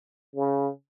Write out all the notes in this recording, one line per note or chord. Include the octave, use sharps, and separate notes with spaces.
C#3